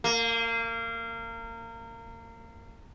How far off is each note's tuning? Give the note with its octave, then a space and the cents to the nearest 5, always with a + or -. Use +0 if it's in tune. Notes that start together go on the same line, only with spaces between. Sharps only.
A#3 -25